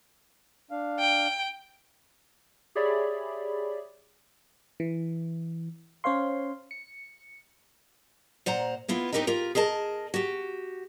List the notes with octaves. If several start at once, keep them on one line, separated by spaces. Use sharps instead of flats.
D4 F5
G5
G4 G#4 C#5 D5 E5 B5
E3
C#4 C5 C#5 F5 C6
C#7
A#2 C5 F#5 A#5
A#3 B3 E4 F4
C4 D#4 G4 A#4 B4 D#5
F4 G4 A#4
G#4 A#4 D#5 A5
F#4 G4